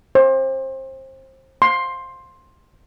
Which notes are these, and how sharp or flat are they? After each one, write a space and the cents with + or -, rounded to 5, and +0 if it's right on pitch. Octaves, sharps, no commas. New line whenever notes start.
C5 +25
C6 +10